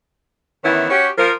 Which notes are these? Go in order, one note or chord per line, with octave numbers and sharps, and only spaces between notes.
D#3 E3 B3 C#4 E4
C#4 F#4 G4
F3 A#4